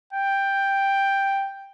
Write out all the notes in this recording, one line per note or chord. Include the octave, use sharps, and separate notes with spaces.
G5